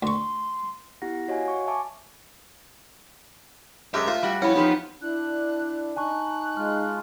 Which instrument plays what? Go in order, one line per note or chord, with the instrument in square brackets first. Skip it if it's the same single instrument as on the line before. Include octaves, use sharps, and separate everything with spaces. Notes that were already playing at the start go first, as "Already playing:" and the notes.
[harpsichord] D2 C#6 [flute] C6
[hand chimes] B3 E4 G4 F#5 A#6
F#4 C#5 D#5 F5 F#5 G#5
C#6
E5 G#5 A5 C#6 D6
[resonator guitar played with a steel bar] F#2 G#3 [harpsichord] G4 A4 [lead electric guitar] E5
[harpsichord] A3 F4 [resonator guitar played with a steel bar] C5
[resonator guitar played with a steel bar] G3 F#4
[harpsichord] F2 C#4 [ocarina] E4 [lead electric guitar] F#5 B5
[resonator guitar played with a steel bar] F3 B3 G4 [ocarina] D#4
[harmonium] D4 [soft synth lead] E4 [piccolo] F#6
[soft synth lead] D#4 [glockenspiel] G#5 A5 C#6 [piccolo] F#6
[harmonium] G#3 F4 [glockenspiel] F6